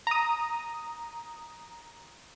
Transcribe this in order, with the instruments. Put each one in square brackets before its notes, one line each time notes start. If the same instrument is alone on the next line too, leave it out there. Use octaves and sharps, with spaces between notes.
[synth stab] A#5 D#6